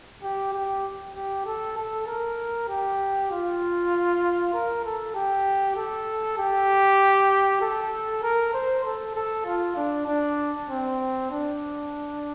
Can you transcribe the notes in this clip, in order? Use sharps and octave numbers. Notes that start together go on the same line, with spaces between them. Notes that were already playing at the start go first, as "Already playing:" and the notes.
G4
G4
G4
A4
A4
A#4
G4
F4
A#4
A4
G4
A4
G4
A4
A#4
C5
A4
A4
F4
D4
D4
C4
D4